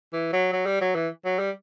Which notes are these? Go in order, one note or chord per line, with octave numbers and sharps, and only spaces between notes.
E3
F#3
F#3
G3
F#3
E3
F#3
G3